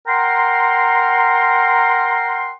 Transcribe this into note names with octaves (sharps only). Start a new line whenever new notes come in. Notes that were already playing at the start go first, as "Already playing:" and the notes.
A#4 F#5 G5 A#5 C6